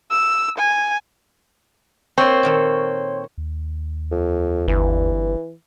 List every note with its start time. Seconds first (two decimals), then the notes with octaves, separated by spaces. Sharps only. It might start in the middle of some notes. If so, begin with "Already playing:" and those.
0.11 E6
0.58 G#5
2.18 A#3 C4 C5 C#5 C6 C#6
2.43 A#2 D#3 A4
3.38 D#2
4.11 F2
4.68 G1 E3